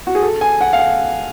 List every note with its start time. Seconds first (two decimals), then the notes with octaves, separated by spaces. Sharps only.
0.07 F#4
0.15 G#4
0.22 A4
0.41 G#5
0.61 F#5
0.73 F5
0.79 F#5